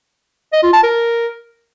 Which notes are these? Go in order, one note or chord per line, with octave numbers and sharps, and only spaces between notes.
D#5
F4
A5
A#4